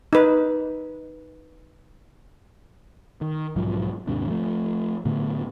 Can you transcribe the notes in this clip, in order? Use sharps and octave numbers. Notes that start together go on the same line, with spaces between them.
D#4 B4
D#3
B1 G#2 F3 F#3
D#2 G#2 C3 D4
F3 A3
A2 D3 A3 B3